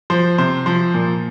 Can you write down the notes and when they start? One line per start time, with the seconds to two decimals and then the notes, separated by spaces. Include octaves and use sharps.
0.10 F3 C5
0.38 C3 C5
0.66 F3 C5
0.94 A#2